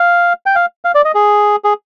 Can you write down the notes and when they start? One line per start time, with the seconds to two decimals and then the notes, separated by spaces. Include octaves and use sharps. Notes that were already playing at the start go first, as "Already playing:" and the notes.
Already playing: F5
0.46 G5
0.55 F5
0.85 F5
0.95 D5
1.05 D#5
1.15 G#4
1.64 G#4